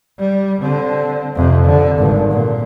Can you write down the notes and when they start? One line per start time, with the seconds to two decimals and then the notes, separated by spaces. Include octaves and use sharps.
0.19 G3
0.61 D3 C4
1.35 F2 C3
1.65 D3
1.97 G#1 G2
2.31 A#2